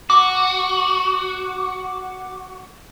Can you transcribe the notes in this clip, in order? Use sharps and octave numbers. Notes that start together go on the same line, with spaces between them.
F#4 D6